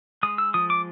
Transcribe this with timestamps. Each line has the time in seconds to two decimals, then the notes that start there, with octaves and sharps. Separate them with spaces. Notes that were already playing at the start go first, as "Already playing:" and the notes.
0.23 G#3 D#6
0.38 E6
0.54 F3 D#6
0.70 D6